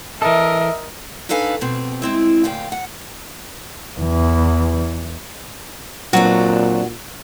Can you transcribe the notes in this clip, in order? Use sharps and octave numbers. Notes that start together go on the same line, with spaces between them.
E3 A4 A#4 D#5 E5
D4 D#4 A4 B4 F5 G#5
B2 C4
G#3 C4 E4
D2 A#2 F5 G5
F#5
E2 E3
A#2 F#3 C4 D4 F#4